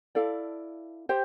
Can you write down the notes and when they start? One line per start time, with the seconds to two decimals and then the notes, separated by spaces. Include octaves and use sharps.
0.15 E4 A4 D5 F5
1.09 G4 C5 G5